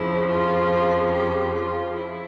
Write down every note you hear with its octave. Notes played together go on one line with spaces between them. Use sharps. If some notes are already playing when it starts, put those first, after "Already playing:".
Already playing: F2 C#3 F3 E4
F4
G4
F4
E4